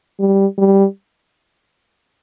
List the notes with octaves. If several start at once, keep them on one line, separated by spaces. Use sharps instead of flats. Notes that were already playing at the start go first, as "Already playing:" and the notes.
G3
G3